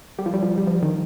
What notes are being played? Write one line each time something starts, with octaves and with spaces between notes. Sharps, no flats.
G3
F3
G3
F3
G3
F3
D#3